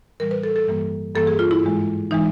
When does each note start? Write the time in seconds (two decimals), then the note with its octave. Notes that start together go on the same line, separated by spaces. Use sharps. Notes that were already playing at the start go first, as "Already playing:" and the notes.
0.20 A2 E3 G3 A#4
0.31 B4
0.44 A4
0.56 A4
0.68 G2 E3 G3 A#3
1.15 G2 E3 G3 A#3 A4
1.27 G#4
1.39 F4
1.51 E4
1.63 G#2 E3 G#3
2.11 E3 G#3 D#4